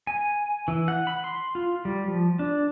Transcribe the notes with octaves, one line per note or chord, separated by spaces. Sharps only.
G#5
E3
F#5
B5
C6
F4
G3
F3
D4